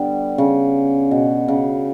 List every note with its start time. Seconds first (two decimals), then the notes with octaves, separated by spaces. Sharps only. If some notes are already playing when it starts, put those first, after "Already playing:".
Already playing: D3 G3 B3
0.38 C#3
1.11 B2
1.48 C#3